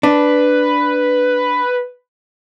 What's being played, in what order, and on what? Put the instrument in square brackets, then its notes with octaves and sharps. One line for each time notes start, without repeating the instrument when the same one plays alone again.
[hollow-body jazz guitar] D4 [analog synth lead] B4